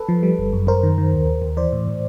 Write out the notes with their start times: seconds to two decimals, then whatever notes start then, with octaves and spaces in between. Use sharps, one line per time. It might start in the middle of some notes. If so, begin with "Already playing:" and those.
Already playing: A4 B4
0.09 F3
0.23 G3
0.38 G1
0.53 F#2
0.67 F#2 A#4 C5
0.83 D#3
0.98 D#3
1.13 D#2
1.27 D#2
1.42 D#2
1.57 E3 C5 D5
1.72 A2
1.87 A2